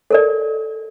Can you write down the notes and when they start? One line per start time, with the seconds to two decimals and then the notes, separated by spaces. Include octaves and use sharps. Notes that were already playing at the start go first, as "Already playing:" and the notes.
0.11 A4 A#4 D5